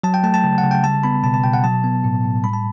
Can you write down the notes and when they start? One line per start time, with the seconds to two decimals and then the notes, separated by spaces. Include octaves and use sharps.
0.03 F#3 A5
0.14 G5
0.24 A3 A5
0.34 A5
0.44 C#3
0.58 F#5
0.64 C#3
0.71 G5
0.84 G3 A5
1.04 B3 B5
1.23 B2 A5
1.34 A5
1.44 B2 G5
1.54 F#5
1.64 F#3 A5
1.84 B3
2.04 A2
2.24 A2
2.44 G3 B5
2.53 A5